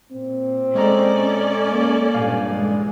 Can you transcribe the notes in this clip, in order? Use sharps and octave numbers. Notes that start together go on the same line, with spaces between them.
A#2 C4
G#3 C#4 A4 D5 D#5 A#5
A#3
G2 A#2 F5 G#5
E3 G#3